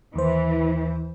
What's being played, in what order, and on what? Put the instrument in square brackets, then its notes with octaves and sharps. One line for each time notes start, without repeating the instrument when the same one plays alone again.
[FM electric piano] D#2 C5 [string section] E3